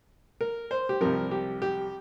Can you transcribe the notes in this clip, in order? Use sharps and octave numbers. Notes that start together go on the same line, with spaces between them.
A#4
C5
G4
C2 C3 F3 A#4
G4
G4